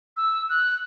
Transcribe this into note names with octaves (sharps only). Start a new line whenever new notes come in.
E6
F#6